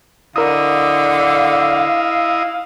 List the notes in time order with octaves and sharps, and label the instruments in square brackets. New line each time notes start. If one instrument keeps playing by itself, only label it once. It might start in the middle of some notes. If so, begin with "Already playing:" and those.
[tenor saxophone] D3 [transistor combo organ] E4 D#5 [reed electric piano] A#4 D#6 [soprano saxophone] F5